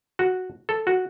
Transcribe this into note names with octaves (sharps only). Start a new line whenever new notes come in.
F#4
A4
F#4